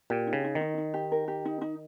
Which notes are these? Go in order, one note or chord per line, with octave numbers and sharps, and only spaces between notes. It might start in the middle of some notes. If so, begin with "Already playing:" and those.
A#2 G4
D#4
C#3
D#4
D#3
D#4
D#4
G4
A#4
G4
D#4
D#4